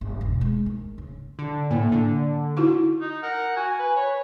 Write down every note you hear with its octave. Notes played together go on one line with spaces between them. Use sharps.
G1
E1
G#3
D#3
C#3
D3
A2 A#3
D3
D#4 E4 F#4
D#4
A#4 F#5
F#4 G#5
B4
B4 C#5